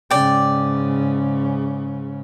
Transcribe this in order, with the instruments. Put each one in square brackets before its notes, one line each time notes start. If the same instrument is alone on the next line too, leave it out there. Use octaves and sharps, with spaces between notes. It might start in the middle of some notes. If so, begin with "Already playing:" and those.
[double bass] G#2 C#3 [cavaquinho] D5 G5